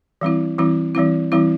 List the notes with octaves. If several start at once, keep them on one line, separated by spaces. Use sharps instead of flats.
E3 G3 C4 E4
E3 G3 C4 E4
E3 G3 C4 E4
E3 G3 C4 E4